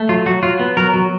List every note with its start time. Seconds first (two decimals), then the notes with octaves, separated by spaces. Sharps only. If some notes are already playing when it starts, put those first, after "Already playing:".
Already playing: A3
0.09 F#3 F4
0.26 F#3 F#4
0.43 F#3 F4
0.59 B3
0.77 F#3 A#4
0.94 F#3